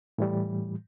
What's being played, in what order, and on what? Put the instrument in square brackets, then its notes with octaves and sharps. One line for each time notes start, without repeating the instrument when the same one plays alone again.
[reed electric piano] A2 E3 G3